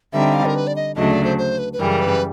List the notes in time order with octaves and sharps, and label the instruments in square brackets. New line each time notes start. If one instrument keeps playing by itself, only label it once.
[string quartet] D3 G3 C4 D#4 [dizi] E5
[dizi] F5
A#4
B4
D5
D#5
[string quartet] D2 C#3 F#3 A3 D4 [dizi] D#5
[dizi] D5
C5
C5
B4
B4
[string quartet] F#2 C#3 E3 G3 [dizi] A#4
[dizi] B4